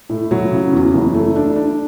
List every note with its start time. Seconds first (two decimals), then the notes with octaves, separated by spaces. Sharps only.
0.09 A2
0.31 F#3
0.52 C#3
0.73 E2
0.94 F#1
1.14 A3
1.36 D4
1.56 D4